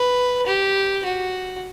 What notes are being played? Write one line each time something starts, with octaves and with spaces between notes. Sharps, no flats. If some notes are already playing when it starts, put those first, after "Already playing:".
Already playing: B4
G4
F#4